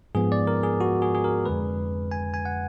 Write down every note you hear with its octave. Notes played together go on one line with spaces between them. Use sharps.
G#2 F3 B3 G#4
D5
A#4
G#4
F#4
G#4
G#4
A#4
F2 D3 G#3 B4
G#5
G#5
F#5